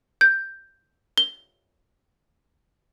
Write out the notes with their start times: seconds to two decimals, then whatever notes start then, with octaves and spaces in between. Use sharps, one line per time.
0.21 G6
1.18 G7